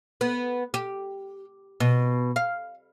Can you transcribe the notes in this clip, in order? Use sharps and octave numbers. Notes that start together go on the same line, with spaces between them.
B3
G4
B2
F5